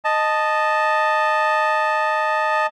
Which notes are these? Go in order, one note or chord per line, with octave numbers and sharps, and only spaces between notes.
D#5 A5